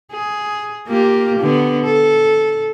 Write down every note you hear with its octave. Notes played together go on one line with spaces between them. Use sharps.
G#4
A#3 F4 G4
D3 B3
A4